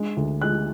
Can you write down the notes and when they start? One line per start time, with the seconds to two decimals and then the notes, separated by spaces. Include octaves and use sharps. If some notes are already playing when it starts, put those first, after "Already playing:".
Already playing: G#3 D4
0.17 D2
0.42 G#3 F#6